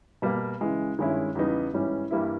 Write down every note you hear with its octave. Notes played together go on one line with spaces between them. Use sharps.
B2 G3 A#3
C#3 E3 G#3
G2 D#3 G#3 C#4 E4
E2 C#3 G3 B3 D#4
G#2 E3 G3 C#4
G2 E3 G3 A#3 E4